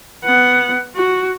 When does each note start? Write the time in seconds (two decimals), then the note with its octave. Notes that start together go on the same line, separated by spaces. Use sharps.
0.24 B3 F#5
0.96 F#4